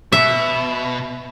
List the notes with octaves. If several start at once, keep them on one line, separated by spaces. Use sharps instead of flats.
B2 E5